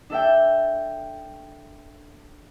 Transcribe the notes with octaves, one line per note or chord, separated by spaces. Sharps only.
D4 A4 E5 G5